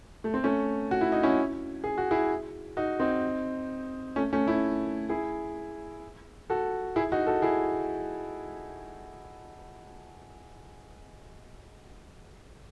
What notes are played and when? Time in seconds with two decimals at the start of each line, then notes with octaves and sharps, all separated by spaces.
0.24 A3
0.34 C4
0.44 A3 C#4
0.91 F#4
1.01 E4
1.12 D#4
1.23 C#4 E4
1.84 G#4
1.98 F#4
2.11 E4 G#4
2.77 D#4 F#4
3.00 C4 D#4
4.16 A3 C#4
4.33 A3 C#4
4.47 C#4 E4
5.09 E4 G#4
6.50 F#4 A4
6.96 E4 G#4
7.12 D#4 F#4
7.27 F#4 A4
7.42 E4 G#4